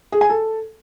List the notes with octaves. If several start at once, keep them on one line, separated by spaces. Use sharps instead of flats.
G#4
G#5
A4